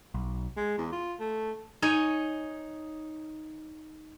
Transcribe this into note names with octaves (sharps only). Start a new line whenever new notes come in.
B1
G#3
E2
F4
A3
D#4 C#5 G#5